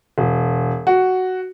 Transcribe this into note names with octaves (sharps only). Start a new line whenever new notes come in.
E1
F#4